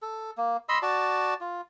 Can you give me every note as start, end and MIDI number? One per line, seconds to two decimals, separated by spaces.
0.02 0.31 69
0.37 0.57 58
0.69 0.78 75
0.69 0.78 83
0.69 0.78 84
0.69 0.78 88
0.82 1.34 66
0.82 1.34 74
0.82 1.34 81
1.41 1.61 65